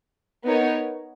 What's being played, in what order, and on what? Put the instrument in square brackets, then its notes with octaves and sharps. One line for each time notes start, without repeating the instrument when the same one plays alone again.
[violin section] B3 D#4 A#4 C#5